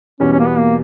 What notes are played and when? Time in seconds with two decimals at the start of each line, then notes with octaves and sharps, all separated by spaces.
0.20 E2 B2 G3 C#4
0.32 C#4
0.39 A#3
0.45 B3
0.58 A#3